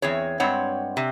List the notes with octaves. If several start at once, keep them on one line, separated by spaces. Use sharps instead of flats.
E2 C4 G#4 C#5
G2 G#3 C4 C#5 F#5
C3